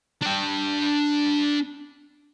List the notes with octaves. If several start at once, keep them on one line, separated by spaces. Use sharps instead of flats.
D4 G5